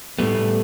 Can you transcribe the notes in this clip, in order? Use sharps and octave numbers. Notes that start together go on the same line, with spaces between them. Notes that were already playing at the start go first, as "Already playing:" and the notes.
A2 G3 A3 B3